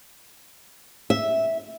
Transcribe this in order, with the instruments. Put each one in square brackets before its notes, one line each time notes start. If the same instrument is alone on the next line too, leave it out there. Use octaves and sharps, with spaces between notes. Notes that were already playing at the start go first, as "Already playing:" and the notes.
[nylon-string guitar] E5